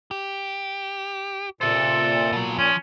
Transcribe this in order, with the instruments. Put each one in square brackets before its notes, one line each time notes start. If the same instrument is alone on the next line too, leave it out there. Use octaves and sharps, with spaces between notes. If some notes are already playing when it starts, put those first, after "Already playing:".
[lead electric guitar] G4
[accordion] A#2 [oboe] A4 [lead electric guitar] C5 E5
[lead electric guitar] B2 F#3
[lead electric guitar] F3 [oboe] C#4